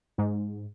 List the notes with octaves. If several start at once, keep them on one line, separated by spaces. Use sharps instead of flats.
G#2